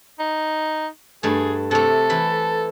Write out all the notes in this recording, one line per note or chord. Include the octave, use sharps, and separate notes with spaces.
D#4
G2 A3 G#4
C3 A3 A4
E3 B5